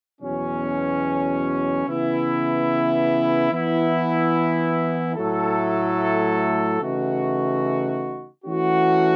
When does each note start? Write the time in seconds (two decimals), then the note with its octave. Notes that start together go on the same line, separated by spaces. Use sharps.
0.21 E2 B2 F#3 C#4
1.86 C#3 E3 B3 E4
3.50 E3 B3 E4
5.15 A2 F#3 A3 E4 A4
6.80 C#3 E3 A3 D#4 F#4
8.45 E3 A3 C#4 F#4